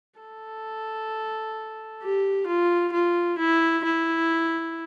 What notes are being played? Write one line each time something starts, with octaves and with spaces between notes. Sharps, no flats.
A4
G4
F4
F4
E4
E4